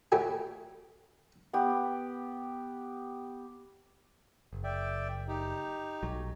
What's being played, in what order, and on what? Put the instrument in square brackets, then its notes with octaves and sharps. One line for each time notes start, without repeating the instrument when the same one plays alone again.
[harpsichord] A2 A3 F#4 G4 G#5
[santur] B3 G4
[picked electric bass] F#1
[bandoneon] D5 E5 G5
D#4 G4
[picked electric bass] B1 F#3